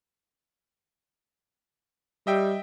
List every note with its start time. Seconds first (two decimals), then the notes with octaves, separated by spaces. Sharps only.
2.27 G3 D#5 E5 G5